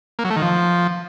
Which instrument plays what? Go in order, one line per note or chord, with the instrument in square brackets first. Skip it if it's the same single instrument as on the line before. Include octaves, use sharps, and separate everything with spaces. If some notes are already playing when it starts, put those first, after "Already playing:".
[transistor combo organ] A#3
F#3
A3
D#3
F3